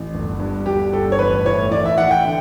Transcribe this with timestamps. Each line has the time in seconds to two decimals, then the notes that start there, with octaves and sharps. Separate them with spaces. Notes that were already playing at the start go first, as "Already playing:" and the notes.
Already playing: A1
0.14 G1
0.40 G2
0.66 G1 G4
0.93 G1 A4
1.12 C#5
1.19 A1 B4
1.45 A2 C#5
1.71 E3 D5
1.85 E5
1.97 E3 F#5
2.11 G5
2.25 D3